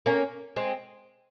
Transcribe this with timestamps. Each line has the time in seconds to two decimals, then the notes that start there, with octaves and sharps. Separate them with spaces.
0.06 A#3 C#4
0.56 G#3 C4